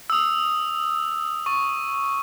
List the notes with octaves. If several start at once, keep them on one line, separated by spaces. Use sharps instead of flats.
D#6 E6
C#6